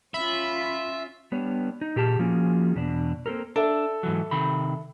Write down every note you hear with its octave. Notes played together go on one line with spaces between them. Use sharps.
C#4 F4 E5 B5
G3 B3 D4 B4 C#5
D#4
A#2 G4 G#4 A5
F3 A#3 C#4 F4 F#4 G#4
E2 B2 D4
A#3 C4 G4 A4 A#4
D4 A4 E5
G#2 E3 F#3
C3 D#3 B5